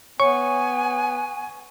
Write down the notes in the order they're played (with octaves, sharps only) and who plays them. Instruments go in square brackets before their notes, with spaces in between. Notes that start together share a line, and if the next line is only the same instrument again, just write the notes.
[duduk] B3 [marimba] C#5 [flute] G#5 [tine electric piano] C#6